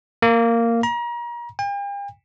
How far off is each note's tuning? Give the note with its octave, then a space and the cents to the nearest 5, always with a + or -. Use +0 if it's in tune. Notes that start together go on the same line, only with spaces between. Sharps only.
A#3 -10
A#5 +35
G5 +45